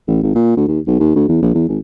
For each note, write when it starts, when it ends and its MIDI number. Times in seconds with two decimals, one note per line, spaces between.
0.08 0.20 33
0.23 0.33 32
0.35 0.55 46
0.57 0.66 38
0.68 0.80 39
0.87 0.97 35
1.00 1.13 39
1.16 1.25 38
1.29 1.38 40
1.42 1.50 34
1.55 1.66 40
1.69 1.79 32